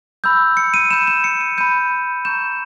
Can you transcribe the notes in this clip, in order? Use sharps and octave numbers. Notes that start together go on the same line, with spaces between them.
B5 E6 G6
C#7
D#7
B5 G6 E7
E7
C#7
D#7
B5 G6 D#7
A#5 C#6 G6 E7